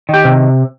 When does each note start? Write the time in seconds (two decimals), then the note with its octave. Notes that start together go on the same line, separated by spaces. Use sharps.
0.09 D#3 G4
0.25 C3